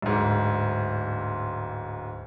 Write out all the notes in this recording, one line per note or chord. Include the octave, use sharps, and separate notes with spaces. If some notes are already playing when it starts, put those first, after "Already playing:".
D1 G#2